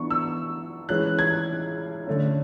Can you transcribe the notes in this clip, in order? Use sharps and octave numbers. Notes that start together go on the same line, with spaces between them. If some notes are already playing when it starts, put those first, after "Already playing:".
Already playing: E3 B3 D4 C#6
E6
E3 G#3 C#4 F#6
G#6
D3 A3 C#4